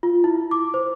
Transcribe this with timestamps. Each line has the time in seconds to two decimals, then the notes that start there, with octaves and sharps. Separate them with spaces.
0.03 F4
0.24 E4
0.51 D6
0.74 C5